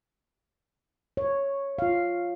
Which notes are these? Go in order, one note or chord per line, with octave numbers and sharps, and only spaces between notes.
C#5
F4 F5